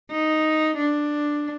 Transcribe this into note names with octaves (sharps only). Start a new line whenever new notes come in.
D#4
D4